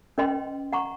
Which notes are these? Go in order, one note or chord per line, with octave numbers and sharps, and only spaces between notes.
C#4 B4 D#5 G5 C6
F#5 A#5 C#6